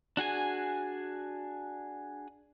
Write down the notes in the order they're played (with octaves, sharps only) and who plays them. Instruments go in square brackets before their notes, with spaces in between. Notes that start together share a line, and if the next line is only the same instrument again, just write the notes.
[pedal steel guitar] D4 F#4 G#4 G#5